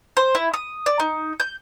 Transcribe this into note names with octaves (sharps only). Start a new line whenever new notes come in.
C5
E4
D#6
D5
D#4
G6